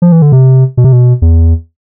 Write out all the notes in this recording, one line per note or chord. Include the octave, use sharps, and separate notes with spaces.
F3
E3
D3
C3
B2
C3
B2
E2